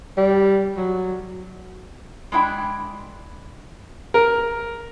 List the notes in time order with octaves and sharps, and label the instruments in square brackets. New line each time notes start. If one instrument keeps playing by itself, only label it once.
[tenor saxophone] G3
F#3
[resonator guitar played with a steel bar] G#3 D4 E4 F#5 G5
[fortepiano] A#4